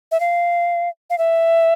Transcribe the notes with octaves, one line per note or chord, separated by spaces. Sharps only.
E5
F5
F5
E5